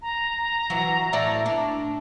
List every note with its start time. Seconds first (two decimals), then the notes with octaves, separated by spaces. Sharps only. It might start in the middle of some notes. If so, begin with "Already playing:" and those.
0.02 A#5
0.70 E3 F#3
1.13 A2 D5 E5
1.46 D4